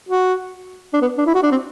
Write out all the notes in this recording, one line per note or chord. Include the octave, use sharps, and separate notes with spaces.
F#4
D4
B3
D4
E4
F#4
D4
C4